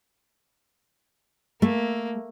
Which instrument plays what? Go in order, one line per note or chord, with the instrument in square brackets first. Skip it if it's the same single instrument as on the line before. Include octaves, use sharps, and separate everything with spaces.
[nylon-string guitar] A3 [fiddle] A#3